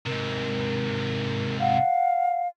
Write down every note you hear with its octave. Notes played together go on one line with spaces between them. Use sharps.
G#2 C3 A#4
F5 F#5